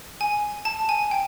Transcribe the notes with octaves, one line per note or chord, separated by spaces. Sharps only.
G#5
A5
G#5
G5